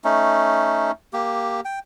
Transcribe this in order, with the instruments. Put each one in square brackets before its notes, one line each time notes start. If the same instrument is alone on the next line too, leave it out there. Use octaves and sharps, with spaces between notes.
[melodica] A3 C#4 D#4
A#3 G4
G5